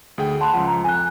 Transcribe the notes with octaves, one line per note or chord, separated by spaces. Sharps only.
D2 G#4 G5
F#5 A5 B5 C6 F#6
C#2 F3 F#5
A#5
F2 G#5 F#6